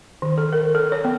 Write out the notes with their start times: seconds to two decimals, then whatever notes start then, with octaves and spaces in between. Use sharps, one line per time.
0.22 D#3
0.38 A4
0.53 A#4
0.75 A4
0.92 C#5
1.05 B3